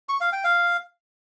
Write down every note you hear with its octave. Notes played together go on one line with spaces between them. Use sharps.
C#6
F5
G5
F5